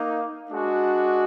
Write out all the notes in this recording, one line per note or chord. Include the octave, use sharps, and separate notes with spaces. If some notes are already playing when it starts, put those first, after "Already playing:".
Already playing: A#3 D#4
G#3 D4 F#4